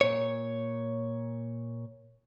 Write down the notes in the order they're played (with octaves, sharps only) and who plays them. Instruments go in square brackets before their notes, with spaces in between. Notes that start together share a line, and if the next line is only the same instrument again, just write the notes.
[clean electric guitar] A#2 C#5